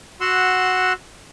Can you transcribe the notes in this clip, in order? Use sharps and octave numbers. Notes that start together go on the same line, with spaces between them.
F#4 F#5 C6 E6